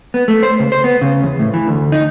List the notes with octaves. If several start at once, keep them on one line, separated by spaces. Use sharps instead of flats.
B3
A3
C5
C#2
C5
B3
C#3
E2
A2
E3
D2
D#4